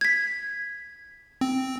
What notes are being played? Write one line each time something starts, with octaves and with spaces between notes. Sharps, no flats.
G#6 B6
C4